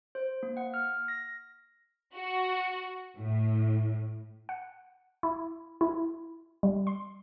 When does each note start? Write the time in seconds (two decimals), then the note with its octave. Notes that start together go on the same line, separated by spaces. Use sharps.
0.15 C5
0.43 A#3
0.57 F#5
0.74 F6
1.08 A#6
2.14 F#4
3.17 A2
4.49 F#5
5.23 E4
5.81 E4
6.63 G3
6.87 C6